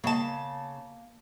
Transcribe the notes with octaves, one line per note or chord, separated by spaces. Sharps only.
C#3 A#3 F5 A5